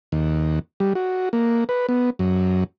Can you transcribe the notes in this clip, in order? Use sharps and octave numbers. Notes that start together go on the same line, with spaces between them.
D#2
G3
F#4
A#3
B4
B3
F#2